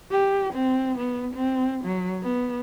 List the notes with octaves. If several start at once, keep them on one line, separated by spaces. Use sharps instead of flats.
G4
C4
B3
C4
F#3
B3